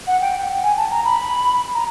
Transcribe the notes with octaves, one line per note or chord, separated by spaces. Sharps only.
F#5
G5
F#5
G5
G#5
A5
A#5
B5
A#5